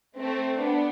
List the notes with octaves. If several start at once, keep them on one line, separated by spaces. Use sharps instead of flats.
A3 C4
B3 D4